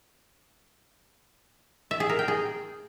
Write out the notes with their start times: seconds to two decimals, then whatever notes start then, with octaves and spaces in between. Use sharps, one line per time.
1.91 E5
2.00 G#4
2.09 A#4
2.19 G5
2.28 G#4